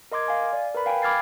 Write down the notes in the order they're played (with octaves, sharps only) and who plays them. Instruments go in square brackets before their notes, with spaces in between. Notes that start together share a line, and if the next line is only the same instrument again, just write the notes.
[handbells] A#4 D#5 C6 D6 G#6
F5 G#5
D5
A#4 B4 B5
F5 G5 G#5
B5 D6 F6 G#6 A6 C7